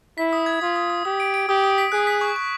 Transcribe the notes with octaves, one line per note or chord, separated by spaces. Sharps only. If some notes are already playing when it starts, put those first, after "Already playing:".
E4 B6
D#6
G#6
F4 D#6
D#6
D#6
G4 D#6
D7
D7
G4 D#6
D#6
B6
G#4 F#6
B6
C#6
C#6